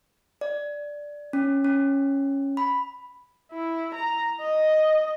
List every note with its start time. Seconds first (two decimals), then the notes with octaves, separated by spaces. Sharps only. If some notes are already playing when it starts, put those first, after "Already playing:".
0.41 D5
1.33 C#4
1.65 C#4
2.57 B5
3.52 E4
3.94 A#5
4.40 D#5